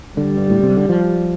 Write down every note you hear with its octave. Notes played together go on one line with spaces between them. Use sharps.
D3 G3
G2
A2
C3
D3
F3